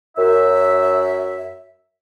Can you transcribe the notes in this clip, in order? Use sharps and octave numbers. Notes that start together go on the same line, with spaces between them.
F#2 E5